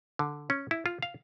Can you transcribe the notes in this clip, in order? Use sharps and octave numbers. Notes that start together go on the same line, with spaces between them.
D3
C#4
E4
F4
F5